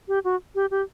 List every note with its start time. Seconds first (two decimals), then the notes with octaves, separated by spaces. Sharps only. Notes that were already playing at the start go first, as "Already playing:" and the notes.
0.08 G4
0.24 F#4
0.55 G4
0.71 G4